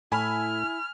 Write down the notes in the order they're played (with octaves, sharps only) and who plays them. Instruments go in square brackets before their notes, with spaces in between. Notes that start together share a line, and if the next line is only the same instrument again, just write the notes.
[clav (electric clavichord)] A2 [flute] E4 [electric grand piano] G#5 B5 [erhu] F6